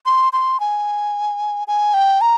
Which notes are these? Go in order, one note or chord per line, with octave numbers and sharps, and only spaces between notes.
C6
C6
G#5
G#5
G5
A#5